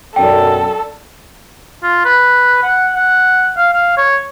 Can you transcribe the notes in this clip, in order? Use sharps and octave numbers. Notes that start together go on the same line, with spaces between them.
B1 F#2 D4 A4 G5
F4
B4
F#5
F#5
F5
F5
C#5